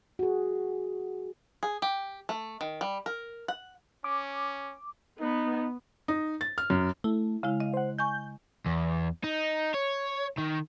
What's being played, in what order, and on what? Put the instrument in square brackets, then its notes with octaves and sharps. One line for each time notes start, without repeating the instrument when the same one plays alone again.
[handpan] F#4 G#4
[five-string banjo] G#4
G4
A3
D#3
G3
A#4
F#5
[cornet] C#4 [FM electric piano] D6
[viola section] B3 [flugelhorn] D#4
[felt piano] D#4
A6
F6
F#2
[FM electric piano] A3 [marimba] E4
[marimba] C#3 G#3 E4 [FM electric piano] F5
[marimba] D#5
[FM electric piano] C5 F#5
[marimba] D#5 G#5 C#6 [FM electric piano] G6
[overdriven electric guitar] E2
D#4
C#5
D#3